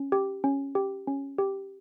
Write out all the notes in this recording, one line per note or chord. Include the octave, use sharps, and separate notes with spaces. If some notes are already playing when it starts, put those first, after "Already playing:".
Already playing: C#4
G4
C#4
G4
C#4
G4